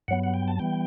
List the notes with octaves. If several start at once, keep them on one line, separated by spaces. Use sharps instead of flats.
G2 F#3 B3 F#5
F#5
G5
A5
E3 G3 B3 G5